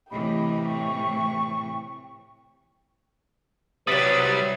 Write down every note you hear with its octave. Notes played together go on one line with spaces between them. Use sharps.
A2 C3 E3 G4 D#5 B5
G5 C#6
C2 C3 F#3 G3 B4 D#6 A6 B6